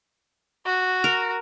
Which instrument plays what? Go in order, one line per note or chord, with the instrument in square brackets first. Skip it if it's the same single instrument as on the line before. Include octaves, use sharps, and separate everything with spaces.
[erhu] F#4
[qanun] A#4